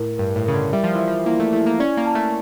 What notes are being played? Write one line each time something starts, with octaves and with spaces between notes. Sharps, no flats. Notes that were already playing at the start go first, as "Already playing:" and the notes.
Already playing: A2 E4 A#4
G2 A#4
A2
C#3 A#4
D3
G3 E5
F3
E3 E5
F3
A#3 E4
A3
A3 E4
A#3
C#4 D5
A#3
A5
A3